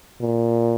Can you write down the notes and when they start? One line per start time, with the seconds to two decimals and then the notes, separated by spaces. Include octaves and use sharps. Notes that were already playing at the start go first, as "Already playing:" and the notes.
0.21 A#2